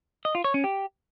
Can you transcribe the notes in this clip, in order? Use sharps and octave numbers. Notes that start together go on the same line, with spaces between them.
D#5
F4
C#5
C#4
G4